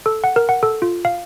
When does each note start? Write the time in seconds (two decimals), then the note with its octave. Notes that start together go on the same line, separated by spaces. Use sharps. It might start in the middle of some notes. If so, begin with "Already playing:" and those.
0.06 A4
0.24 F#5
0.36 A#4
0.49 F#5
0.63 A4
0.82 F4
1.05 F5